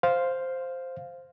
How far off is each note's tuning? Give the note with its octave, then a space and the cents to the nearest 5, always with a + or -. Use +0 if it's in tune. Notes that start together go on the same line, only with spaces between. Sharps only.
C5 +0 F5 +0